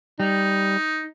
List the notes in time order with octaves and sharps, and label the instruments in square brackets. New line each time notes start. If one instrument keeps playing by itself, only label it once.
[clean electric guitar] G3 [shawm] D#4